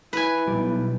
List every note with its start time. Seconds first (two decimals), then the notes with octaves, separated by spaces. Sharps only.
0.13 E4 B4 G#5
0.47 B1 G3 G4 C#7